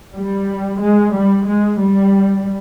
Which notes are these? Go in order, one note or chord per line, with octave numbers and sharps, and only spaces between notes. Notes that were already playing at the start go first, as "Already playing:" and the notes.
G3
G#3
G3
G#3
G3